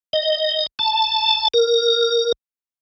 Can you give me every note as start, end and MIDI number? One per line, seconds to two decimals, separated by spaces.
0.13 0.66 75
0.79 1.48 81
1.54 2.32 70